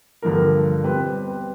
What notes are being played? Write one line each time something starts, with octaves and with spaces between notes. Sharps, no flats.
G2 D3 F3 A#3 A#4
B2 G3 C4 B4
B4